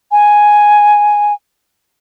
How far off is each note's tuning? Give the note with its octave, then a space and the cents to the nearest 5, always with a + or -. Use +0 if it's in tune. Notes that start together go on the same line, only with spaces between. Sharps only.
G#5 +0